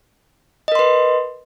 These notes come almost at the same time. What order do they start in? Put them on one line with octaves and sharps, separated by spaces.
D#5 A#4 C6 B4